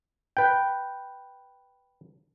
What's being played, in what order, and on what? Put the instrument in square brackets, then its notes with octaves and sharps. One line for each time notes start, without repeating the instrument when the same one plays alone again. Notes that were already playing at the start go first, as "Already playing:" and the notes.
[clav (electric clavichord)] B4 G5